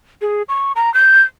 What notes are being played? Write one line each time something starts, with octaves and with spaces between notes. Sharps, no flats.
G#4
C#6
A#5
G6